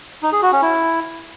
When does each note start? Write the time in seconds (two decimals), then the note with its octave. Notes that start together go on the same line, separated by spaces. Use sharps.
0.22 D#4
0.32 G#4
0.42 F#4
0.52 C#4
0.62 E4